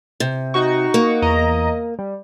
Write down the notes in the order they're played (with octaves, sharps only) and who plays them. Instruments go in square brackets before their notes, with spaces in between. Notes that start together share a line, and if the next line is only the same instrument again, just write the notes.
[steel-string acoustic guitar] C3
[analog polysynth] D#4 F#4 C#6
[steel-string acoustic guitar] A#3
[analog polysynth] E2 D#5 A#5
G3